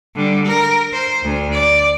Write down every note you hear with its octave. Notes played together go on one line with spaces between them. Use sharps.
D3 G3
A#4
C5
D2
D5